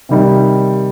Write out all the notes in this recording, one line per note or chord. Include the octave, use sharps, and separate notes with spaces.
C3 D#3 G3 D#4